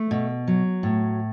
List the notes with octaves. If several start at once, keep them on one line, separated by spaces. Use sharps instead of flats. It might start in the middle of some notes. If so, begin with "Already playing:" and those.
Already playing: A3
B2
F#3
A2